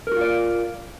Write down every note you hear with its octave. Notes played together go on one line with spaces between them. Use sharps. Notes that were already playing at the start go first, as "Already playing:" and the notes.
F4 F#4 A#4 D5